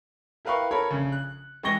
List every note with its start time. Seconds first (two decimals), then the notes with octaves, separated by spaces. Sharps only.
0.45 E4 A#4 B4 F5 G5 C#6
0.71 A4 A#4 C#5 B5
0.90 A#1 C#3
1.12 F#6
1.63 E3 G#3 G5 C#6 A#6 G7